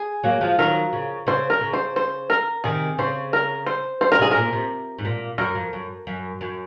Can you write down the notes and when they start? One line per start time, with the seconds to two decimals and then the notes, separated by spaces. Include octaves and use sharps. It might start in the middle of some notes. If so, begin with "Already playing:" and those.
Already playing: G#4
0.24 F#3 A#3
0.41 F3 G#3
0.58 D#3 F#3 A#4
0.93 C#3
1.27 C#3 C5
1.50 A#4
1.61 C#3
1.73 C5
1.96 C5
2.30 A#4
2.64 C3 D#3 G#4
2.98 C#3 C5
3.33 A#4
3.66 C5
4.01 C5
4.12 A#4
4.19 C3 G#4
4.31 A#2 A#4
4.53 C3
4.99 G#2
5.05 A#2
5.38 F#2 A#4
5.55 F2
5.73 F#2
6.07 F#2
6.41 F#2